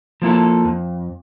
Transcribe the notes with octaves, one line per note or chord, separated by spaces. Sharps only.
F3 A#3 E4 A4
F2